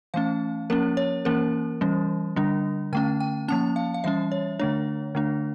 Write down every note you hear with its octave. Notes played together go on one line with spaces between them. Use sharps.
E3 A3 C#4 F5
F3 A#3 C#4 A#4
C#5
E3 A#3 C#4 A#4
E3 G3 C#4
D3 G3 D4
D3 A3 C#4 G5
G5
F3 A#3 C#4 A5
F5
F5
E3 G3 C#4 E5
C#5
D3 A3 D4 C#5
D3 A3 D4